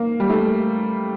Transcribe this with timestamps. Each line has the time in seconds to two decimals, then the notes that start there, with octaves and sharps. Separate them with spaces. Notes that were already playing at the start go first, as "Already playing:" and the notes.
Already playing: A#3
0.20 G3
0.30 A3